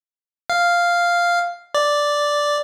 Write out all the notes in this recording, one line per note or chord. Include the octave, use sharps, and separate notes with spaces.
F5
D5